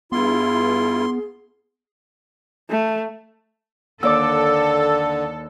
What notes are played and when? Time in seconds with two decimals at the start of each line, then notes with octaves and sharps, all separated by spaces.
0.12 G2 B3 E4 F4 G#4 C6
2.70 A3
4.03 D#2 D3 A4 D5 D6 E6